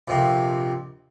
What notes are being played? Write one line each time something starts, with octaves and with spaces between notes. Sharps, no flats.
A#1 F2 C3